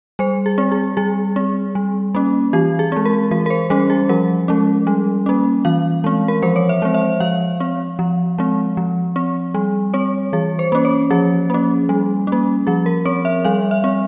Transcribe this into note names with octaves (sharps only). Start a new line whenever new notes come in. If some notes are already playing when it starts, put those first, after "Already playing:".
G3 C5
G#4
C4
G#4
G3 G#4
C4
G3
A#3 C#4
E3 G4
G#4
G#3 C4
A#4
E3 A#4
A#4
C5
G3 C#4 A#4
G#4
F3 A#4
G#3 C#4
G3
A#3 C#4
E3 F5
G#3 C4
A#4
F3 C5
C#5
E5
G#3 C4
E5
F3 F5
C4
F3
G#3 C4
F3
C4
G3
C4 C#5
E3 G#4
C5
A#3 C#4
C#5
F3 G#4
A#3 C#4
G3
A#3 C#4
F3 G#4
A#4
C4 C#5
E5
G3 F5
E5
C4